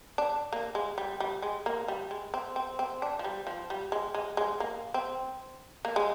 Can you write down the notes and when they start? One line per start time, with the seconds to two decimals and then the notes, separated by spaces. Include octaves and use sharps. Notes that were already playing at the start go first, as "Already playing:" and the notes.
0.18 D4
0.53 A#3
0.75 G#3
0.98 G3
1.20 G3
1.42 G#3
1.66 A#3
1.88 G3
2.11 G#3
2.34 C4
2.56 C4
2.79 C4
3.02 D4
3.19 F3
3.24 G3
3.47 F3
3.70 G3
3.92 G#3
4.14 G#3
4.37 G#3
4.60 A#3
4.94 C4
5.85 A#3
5.96 G#3